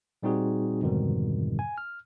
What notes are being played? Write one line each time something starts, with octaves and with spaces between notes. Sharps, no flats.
A#2 G3 C4 D#4 F#4 G#4
F2 G#2 B2 D3 D#3 G3
G#5
F6